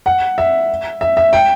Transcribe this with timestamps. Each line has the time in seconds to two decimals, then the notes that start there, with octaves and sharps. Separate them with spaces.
0.06 F#5
0.38 E5
1.01 E5
1.17 E5
1.33 G5